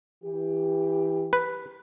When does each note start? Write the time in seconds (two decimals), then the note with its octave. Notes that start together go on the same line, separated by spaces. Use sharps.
0.24 E3 G4
1.33 B4